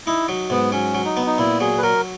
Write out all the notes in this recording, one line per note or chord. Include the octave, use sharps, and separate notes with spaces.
D#4 E4
F#3
G#2 B3
F#3 C#4
F#3
D#4
B3
D#4
A#2 E4
F#3 G#4
B4
F#3 A#4